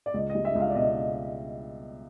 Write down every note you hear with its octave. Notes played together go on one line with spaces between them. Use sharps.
D5
C#2 D#5
D#5
G3
E5
C#2
F5
D5
B2 D#5